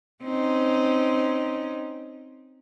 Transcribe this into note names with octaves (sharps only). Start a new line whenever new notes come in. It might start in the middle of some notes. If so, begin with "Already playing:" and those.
C4 C#4 D#4